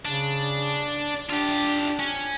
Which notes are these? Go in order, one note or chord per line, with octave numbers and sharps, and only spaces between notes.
C#3 D4
D4 F4 G4
C#4